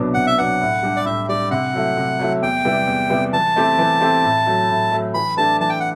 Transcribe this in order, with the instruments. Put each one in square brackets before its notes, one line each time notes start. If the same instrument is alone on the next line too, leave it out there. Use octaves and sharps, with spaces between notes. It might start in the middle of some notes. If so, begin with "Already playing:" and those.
Already playing: [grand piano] C2 B2 F#3 B3 D4
[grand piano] C2 [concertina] F#5
[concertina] E5
[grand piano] B2 F#3 B3 D4 [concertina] F#5
[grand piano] A2
G3 D4 G4
[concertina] D5
[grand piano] A2 [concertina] E5
[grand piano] G3 D4 G4 [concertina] D5
[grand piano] C3 [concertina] F#5
[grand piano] F#3 A3 E4
C3
F#3 A3 E4
[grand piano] E2 [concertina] G5
[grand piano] C3 G3 B3 E4
E2
C3 G3 B3 E4
[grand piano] E3 [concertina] A5
[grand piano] A3 C4 E4 G4
E3
A3 C4 E4 G4
A2
F#3 A3
A2
F#3 A3
[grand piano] E3 [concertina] B5
[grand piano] A3 D4 G4 B4 [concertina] A5
[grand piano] E3 [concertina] A5
[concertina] G5
F#5